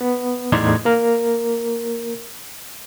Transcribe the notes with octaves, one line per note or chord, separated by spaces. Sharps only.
B3
E2 A2 D#4 D5 C6 G#6
A#3 A#4